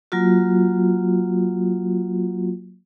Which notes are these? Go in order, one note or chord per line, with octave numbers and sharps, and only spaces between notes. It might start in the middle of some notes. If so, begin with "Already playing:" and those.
F#3 A#3 F4 F#4